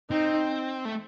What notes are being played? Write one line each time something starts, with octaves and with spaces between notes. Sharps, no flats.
C4 D#4
A3